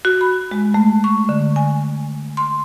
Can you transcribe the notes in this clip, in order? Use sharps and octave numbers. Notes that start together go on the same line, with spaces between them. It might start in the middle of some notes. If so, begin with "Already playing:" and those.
F#4
B5
G#3
A3
C#6
D3
G#5
C6